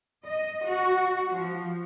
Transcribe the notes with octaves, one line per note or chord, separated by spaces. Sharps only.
D#5
F#4
F3